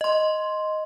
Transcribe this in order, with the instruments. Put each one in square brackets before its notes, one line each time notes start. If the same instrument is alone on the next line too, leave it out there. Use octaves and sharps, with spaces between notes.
[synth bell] D#5 C6